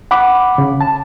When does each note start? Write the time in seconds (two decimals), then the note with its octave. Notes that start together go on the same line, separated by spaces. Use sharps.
0.11 F#5 B5 D6
0.58 C#3
0.81 A5